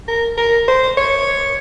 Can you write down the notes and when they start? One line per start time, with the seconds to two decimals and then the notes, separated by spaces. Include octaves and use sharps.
0.08 A#4
0.37 A#4
0.68 C5
0.97 C#5